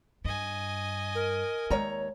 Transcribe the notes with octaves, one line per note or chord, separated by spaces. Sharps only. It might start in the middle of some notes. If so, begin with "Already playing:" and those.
G2 D#5 G#5
A#4
D#2 G#3 C#5 A#5